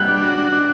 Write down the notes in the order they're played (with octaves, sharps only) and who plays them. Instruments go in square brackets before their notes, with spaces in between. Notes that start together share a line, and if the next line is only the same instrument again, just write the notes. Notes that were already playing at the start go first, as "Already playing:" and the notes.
Already playing: [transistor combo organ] G3 [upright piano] F#6
[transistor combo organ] D4
F#4
D4
D4